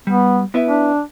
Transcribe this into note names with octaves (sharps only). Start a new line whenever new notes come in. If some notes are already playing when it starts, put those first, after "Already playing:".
G3 B3
B3 E4 B4 E5
D4